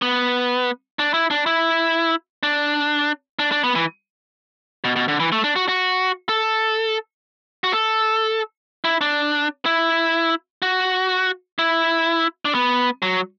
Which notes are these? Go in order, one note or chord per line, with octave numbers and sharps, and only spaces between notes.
B3
D4
E4
D4
E4
D4
D4
D4
B3
E3
B2
B2
D3
E3
A3
D4
F#4
F#4
A4
F#4
A4
E4
D4
E4
F#4
E4
D4
B3
F#3